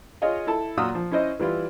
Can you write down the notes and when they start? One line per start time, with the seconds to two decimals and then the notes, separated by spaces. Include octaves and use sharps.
0.22 F4 G#4 C#5 D#5 F5
0.47 E4 A4 A5
0.77 A#2 F#3 F4 F5 D#6 E6
0.95 F3
1.11 C#4 E4 C5 D#5
1.39 E3 G3 E4 F4